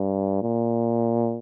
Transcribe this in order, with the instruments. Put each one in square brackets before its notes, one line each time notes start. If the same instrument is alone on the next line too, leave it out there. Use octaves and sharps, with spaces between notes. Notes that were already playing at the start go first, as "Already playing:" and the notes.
Already playing: [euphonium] G2
A#2